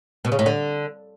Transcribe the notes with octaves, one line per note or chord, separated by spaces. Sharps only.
B2
C#3
A2
D3